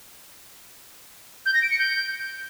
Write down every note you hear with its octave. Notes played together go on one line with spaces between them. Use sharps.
G6
A#6
D7
C#7
G6